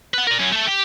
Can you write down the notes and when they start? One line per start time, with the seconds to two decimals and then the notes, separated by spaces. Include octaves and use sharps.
0.14 B4 F#5
0.27 A#4 D5
0.39 F#2 C#4
0.52 A3 A4
0.67 G4